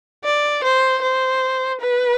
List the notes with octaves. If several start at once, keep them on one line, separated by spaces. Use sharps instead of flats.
D5
C5
C5
B4